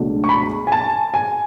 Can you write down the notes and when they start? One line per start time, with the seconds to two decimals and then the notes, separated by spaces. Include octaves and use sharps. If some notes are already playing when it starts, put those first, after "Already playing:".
Already playing: C#2 B2 F#3 A3 D4
0.24 C#6
0.29 B5
0.67 G#5
0.72 A5
1.14 G#5